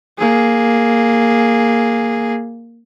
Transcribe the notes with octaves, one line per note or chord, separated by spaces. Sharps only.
A#3 G#4